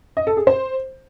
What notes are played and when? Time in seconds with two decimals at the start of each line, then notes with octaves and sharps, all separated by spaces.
0.17 D#5
0.27 A4
0.37 G#4
0.47 C5